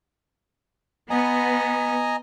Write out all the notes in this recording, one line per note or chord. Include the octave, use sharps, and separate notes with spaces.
B3 D#5 G#5 A#5